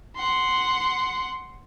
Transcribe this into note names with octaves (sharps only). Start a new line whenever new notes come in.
F#5 C6